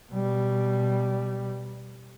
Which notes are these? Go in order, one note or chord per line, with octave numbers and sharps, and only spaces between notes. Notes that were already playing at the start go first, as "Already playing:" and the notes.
B2 G3